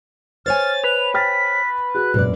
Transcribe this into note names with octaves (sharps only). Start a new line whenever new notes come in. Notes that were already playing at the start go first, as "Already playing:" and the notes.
C5 C#5 G#5 F6 A6
B4 F7
G5 F6 A6 B6
F#4 G#4 F#6
E1 A#1 F#2 B4 D5